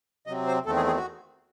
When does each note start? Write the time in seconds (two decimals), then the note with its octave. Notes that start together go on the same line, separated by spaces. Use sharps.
0.27 C3 F#3 C4 D#5
0.47 C5
0.66 E2 D#3 A3 C4 A4
0.76 G#4
0.87 G#4
0.97 F#4